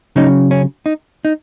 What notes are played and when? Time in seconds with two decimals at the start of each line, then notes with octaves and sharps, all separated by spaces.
0.16 C#3 F#3 C#4 D#4
0.51 C#4
0.86 D#4
1.25 D#4